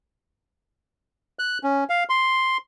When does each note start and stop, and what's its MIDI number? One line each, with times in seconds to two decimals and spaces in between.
1.39 1.58 90
1.63 1.84 61
1.90 2.04 77
2.09 2.57 84